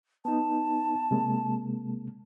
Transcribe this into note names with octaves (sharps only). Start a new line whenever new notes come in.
B3 D#4 A5
C3 G#3 A#3